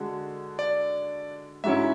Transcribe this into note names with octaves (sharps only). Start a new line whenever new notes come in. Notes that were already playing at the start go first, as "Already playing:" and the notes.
Already playing: D3 G#3 F#4
D5
G#2 F#3 C#4 E4 E5